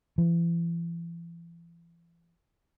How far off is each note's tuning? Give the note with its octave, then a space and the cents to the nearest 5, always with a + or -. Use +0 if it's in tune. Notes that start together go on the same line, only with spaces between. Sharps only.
E3 +40